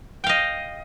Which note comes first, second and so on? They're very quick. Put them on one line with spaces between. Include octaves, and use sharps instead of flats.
G5 F5 D#5